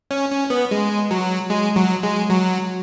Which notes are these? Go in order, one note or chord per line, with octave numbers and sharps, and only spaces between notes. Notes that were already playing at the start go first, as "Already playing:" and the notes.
C#4
C#4
B3
G#3
F#3
G#3
F#3
G#3
F#3